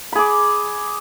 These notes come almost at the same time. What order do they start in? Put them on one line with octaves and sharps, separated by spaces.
B5 G#4 D6